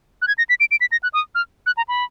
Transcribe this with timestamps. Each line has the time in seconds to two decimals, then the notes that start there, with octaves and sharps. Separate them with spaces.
0.22 F#6
0.28 G#6
0.38 A#6
0.49 B6
0.60 D7
0.71 D7
0.81 B6
0.92 A#6
1.03 F#6
1.14 D#6
1.35 F6
1.66 F#6
1.77 A#5
1.88 B5